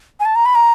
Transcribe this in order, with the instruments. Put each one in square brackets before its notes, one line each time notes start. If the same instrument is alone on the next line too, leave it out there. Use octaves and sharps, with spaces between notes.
[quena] G#5
A5
A#5
B5
A#5